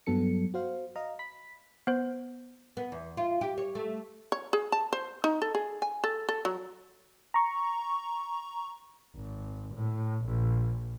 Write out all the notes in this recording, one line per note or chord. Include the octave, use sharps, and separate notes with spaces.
G2 F#3 B3 A4 C#7
F#4 C5 F5
D#5 F5 A#5
B5 B6
B3 C5
B3
E2
F4
G4
C#5
A3
C#5
G#4
A5
C5
D#4
A4
G#4
G#5
A4
A4
F#3
A#5 C#6
G#1
A2
A#1